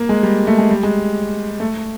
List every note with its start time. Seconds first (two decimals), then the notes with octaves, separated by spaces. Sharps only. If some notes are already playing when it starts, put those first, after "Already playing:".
Already playing: A#3
0.09 G#3
0.23 G3
0.47 A3
0.58 G#3
0.70 G3
0.83 G#3
1.60 A3